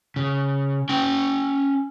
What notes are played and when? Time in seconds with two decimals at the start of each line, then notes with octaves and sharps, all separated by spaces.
0.16 C#3
0.89 C#4 G5